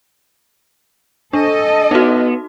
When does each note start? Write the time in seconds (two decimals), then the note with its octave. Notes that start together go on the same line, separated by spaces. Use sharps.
1.33 D4 A4 D#5
1.91 B3 D#4 F#4